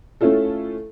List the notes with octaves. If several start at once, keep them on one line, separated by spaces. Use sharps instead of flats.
A3 C#4 E4 F4 A4